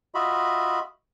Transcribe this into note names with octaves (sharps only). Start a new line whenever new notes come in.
F4 F#4 D#5 E5 B5